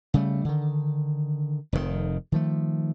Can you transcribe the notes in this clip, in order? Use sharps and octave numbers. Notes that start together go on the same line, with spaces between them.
C#3 G3 A3
D3 D#3
F1 F2 A2 D#3
D#3 F3 A3